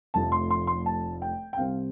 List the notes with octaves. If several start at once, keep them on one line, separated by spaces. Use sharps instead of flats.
F1 F2 F3 A3 A5
C6
C6
C6
A5
G5
G5
C2 C3 G3 C4 F5